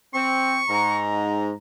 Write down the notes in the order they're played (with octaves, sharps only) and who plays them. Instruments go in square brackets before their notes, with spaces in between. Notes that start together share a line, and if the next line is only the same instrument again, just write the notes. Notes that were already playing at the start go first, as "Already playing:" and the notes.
[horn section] C4 [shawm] C#6
[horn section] G#2 A#5